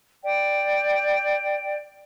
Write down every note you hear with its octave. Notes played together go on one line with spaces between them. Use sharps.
D5 G5